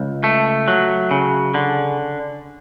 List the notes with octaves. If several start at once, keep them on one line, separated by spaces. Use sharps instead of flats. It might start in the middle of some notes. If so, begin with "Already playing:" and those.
Already playing: C#2
A3
F#3
C#3
D3